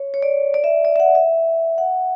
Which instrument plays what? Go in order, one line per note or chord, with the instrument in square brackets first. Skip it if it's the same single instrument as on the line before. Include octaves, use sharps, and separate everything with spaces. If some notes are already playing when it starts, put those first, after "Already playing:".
Already playing: [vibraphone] C#5
C#5
D5
D5
E5
D5
E5
F#5
E5
F#5